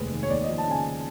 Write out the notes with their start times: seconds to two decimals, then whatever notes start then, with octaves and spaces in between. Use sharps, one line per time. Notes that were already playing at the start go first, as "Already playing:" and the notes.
Already playing: F1 D#2 D#3 G#3 G#4 B4
0.11 D#3
0.23 C#5
0.30 D#2 D5
0.44 D#5
0.48 F3
0.58 A5
0.67 C#3 G#5